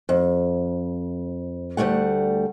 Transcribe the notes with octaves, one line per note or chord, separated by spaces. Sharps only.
F2
D2 G2 G3 A3 F#5